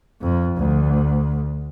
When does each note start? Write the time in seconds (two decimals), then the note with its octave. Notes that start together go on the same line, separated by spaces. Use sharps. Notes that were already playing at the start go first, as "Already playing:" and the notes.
0.21 F2
0.57 D2